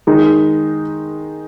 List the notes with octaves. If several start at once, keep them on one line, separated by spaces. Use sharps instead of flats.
D#3 G#3 D#4